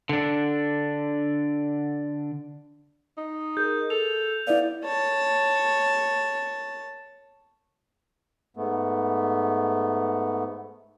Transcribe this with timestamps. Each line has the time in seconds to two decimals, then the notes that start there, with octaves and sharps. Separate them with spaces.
0.09 D3 D4
3.18 D#4
3.57 G#4 A#4 G6
3.90 A4 F7
4.47 B3 E4 D5 E5 F5
4.84 C#5 A5
8.57 G#2 A3 B3